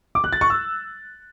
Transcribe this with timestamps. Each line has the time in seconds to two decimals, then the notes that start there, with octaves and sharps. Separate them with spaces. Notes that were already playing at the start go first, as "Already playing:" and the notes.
0.15 D6
0.24 F#6
0.33 A6
0.41 C#6
0.50 E6